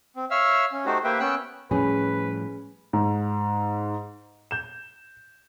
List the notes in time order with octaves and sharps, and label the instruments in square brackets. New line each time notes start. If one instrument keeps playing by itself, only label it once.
[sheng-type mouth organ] C4
C#5 E5 F5 E6 F6
C#4
A3 D#4 F#4 G4 C5
A#3 G4 B4 C5 E5 G5
B3 C#4 G5 E6 F#6
[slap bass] A2 F3 G3 [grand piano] C#4 [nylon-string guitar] G#4 [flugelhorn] B4
[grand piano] G#2
G6 E7